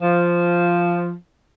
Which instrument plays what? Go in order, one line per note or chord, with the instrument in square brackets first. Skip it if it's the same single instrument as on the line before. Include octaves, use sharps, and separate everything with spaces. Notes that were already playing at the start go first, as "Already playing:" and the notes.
[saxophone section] F3